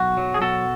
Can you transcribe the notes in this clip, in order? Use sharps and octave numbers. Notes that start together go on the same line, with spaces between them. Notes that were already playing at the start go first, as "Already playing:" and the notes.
Already playing: B1 F#4
F#3
G#4
B2 F#4 A4